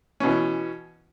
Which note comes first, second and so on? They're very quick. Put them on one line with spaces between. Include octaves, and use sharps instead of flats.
C#4 B2 E3